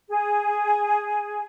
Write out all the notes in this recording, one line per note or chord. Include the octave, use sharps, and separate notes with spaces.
G#4